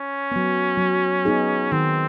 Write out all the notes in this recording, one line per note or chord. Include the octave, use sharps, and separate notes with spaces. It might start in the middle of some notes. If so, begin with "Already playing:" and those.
Already playing: C#4
F#3 B3
F#3
B3 D#4 G#4
D#3 C4